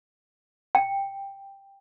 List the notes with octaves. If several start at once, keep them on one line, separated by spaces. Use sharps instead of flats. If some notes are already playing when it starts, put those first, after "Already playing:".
G5